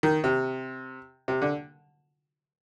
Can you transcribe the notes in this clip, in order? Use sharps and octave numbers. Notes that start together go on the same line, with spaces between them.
D#3
C3
C3
D3